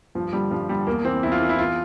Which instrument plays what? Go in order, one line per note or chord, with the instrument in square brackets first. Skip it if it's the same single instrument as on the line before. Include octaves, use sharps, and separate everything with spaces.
[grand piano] G2 F3
D3 G3
G2 F3
D3 G3
E2 A#3
E3 C4
E2 E4
F4
E3
E4
E2 F4